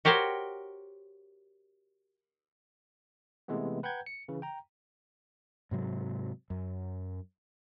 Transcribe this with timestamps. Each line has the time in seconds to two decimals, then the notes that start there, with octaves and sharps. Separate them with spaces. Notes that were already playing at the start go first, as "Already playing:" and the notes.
0.05 F#4 G4 A#4 C5 C#5
3.48 C3 E3 G#3 A3 B3
3.83 B4 F#5 G5 A#5 G6 G#6
4.06 C#7
4.28 C#3 E3
4.42 G5 A#5
5.71 G#2 C3 F#3
6.50 F#2